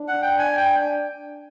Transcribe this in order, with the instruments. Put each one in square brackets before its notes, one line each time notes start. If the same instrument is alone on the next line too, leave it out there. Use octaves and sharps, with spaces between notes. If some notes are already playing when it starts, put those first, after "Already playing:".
Already playing: [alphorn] D4
[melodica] F#5
G5
G#5
G5